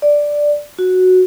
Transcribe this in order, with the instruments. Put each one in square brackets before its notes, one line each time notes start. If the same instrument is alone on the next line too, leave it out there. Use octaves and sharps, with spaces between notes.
[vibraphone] D5
F#4